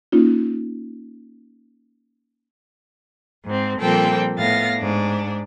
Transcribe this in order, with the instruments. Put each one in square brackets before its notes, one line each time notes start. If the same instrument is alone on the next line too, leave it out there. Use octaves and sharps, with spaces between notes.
[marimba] A#3 C#4 D#4 F4
[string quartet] G#2 C4
A#2 F3 G3 C4 A4 G5
A2 B3 F5 A6 A#6
G#2 D4